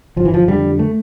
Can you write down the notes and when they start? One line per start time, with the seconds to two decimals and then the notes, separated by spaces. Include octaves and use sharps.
0.16 G1 F3
0.25 E3
0.34 F3
0.48 F2 D3 G3
0.79 A3